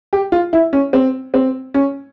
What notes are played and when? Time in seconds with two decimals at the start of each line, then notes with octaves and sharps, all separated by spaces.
0.13 G4
0.32 F4
0.53 E4
0.73 C#4
0.93 C4
1.34 C4
1.74 C#4